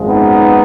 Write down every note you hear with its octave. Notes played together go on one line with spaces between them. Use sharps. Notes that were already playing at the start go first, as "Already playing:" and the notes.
Already playing: G#1 F#2 F3 G#3
B3 D#4